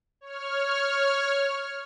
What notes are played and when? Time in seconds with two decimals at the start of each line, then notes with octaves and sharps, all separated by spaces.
0.21 C#5 F6